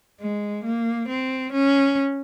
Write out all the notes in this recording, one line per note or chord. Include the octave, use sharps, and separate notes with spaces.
G#3
A#3
C4
C#4